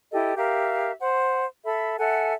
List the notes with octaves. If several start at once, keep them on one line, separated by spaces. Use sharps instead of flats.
E4 G4 A4 D#5
G4 A#4 E5 F5
C5 F#5
A4 E5 B5
A4 E5 F#5 G#5